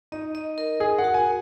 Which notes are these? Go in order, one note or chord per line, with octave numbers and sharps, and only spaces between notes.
D#4 D#5
D#5
A#4
G#4 A#4
F#5
F#4
G#5